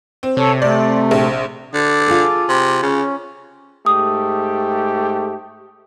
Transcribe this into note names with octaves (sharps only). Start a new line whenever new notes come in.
C4
C3 A4 C#5
A3 D5
A#1
D3 A4 D6
F4 G#4
C3
C#3 C#4
G#2 A3 G4 D#6